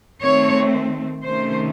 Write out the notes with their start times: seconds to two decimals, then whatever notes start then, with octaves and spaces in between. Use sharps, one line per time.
0.21 D#3 A3 C4 C#5
1.23 C3 D#3 A3 C#4 C5